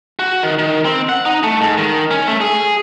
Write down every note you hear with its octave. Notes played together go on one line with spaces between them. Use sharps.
F#4
D#3
D#3
C4
F#5
D#4
A3
G#2
D#3
C#4
A3
G#4